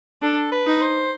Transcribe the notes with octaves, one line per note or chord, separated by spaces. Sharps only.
D4 A4
B4
D#4
C5